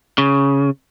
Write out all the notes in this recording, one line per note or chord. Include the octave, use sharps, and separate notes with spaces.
C#3